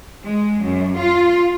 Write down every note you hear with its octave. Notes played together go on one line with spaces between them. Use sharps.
G#3
F#2
F4